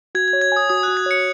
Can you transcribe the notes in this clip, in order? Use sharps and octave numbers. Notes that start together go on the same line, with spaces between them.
F#4 G#6
G#6
C#5
G#6
G#5 D#6
F#4 D#6
F#6
F#4
G#6
C#5 C#7